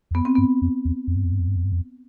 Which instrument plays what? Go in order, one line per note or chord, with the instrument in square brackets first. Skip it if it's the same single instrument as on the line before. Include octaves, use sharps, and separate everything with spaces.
[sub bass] E2
[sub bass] F2 [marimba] B3
[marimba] C4
[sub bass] G2 [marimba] B3
[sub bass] F2
E2
F2
G2
F2
G2
F2
G2
F2
G2
F2